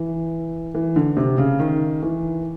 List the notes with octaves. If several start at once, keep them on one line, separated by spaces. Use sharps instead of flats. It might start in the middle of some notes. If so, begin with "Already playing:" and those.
Already playing: E3
E3
D3
C3
C#3
D#3
E3